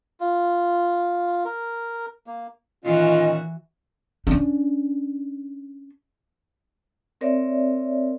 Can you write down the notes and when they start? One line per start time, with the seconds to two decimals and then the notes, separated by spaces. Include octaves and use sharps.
0.20 F4
1.45 A#4
2.27 A#3
2.84 A#2 D#3 E3 C#4 F4 F#4 D#5
4.27 C#4 D4
7.21 C4 A#4 C#5 D5 E5